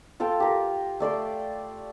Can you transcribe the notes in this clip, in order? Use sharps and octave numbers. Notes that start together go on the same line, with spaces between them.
F4 A4 F5 G5
G4 A#4
A3 D5 C6 D6